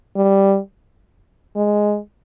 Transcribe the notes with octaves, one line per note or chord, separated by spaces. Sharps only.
G3
G#3